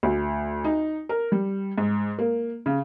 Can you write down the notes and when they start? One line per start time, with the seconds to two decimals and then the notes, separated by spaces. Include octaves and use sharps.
0.03 D2
0.64 D#4
1.09 A#4
1.32 G3
1.78 G#2
2.19 A#3
2.66 C#3